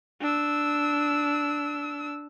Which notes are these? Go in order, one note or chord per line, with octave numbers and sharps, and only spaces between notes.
D4 E6